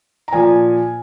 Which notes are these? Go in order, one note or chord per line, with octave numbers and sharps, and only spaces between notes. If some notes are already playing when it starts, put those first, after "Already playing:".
A#5
A#2 F3 G#5